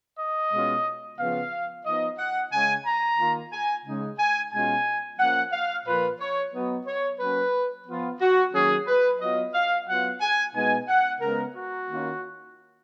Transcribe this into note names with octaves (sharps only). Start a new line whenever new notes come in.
D#5
B2 G#3 C#4 F4
C#3 F3 B3 F4 F5
F3 B3 D#4 D#5
F#5
C#3 G#3 C#4 G#5
A#5
D#3 A#3 F4
G#5
C#3 G#3 D#4
G#5
B2 G#3 C#4 F4 G#5
F3 A#3 C#4 F#5
F5
A#2 F3 A#3 F4 B4
C#5
F#3 B3 D#4
C#5
F#3 A#3 C#4 B4
F3 B3 F4
F#4
D#3 F#3 A#3 C#4 G#4
B4
F#3 B3 F4 D#5
F5
F#3 B3 F4 F#5
G#5
B2 G#3 B3 D#4 G#5
F#5
C#3 G#3 B3 A#4
F#4
D#3 A#3 C#4 F4